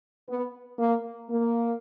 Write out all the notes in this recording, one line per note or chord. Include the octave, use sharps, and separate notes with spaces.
B3
A#3
A#3